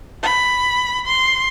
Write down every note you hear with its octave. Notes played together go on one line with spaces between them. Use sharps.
B5
C6